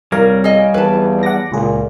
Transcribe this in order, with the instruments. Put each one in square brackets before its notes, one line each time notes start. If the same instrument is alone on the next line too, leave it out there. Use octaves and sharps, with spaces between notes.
[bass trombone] C2 [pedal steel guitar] G3 C#5 A#5 [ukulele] A#4 [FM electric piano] F5
[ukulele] G#4 D#5
[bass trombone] E2 [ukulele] B4 A5
[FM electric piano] F#5 D6 A#6
[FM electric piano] C#2 G#4 [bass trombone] A#2